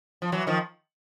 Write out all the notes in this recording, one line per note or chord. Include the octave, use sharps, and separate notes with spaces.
F3
E3 F#3
D#3 F3